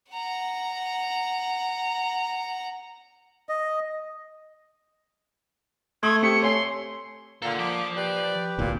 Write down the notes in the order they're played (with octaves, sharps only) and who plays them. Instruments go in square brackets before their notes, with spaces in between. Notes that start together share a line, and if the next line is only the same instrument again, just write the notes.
[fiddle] F#5 A#5
[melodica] D#5
[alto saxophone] A3 [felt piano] C6 D#6 [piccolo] G#6
[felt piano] C4 G4 B6 [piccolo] C#7
[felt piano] C#5 G#5 C7 [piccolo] C6
[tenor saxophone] A#2 [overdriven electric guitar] A4 F#5 [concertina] F5 A#5 F6
[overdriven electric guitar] F3 [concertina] D6
[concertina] G4 B4 [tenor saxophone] D5
[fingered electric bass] D1 B1 [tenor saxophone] A#2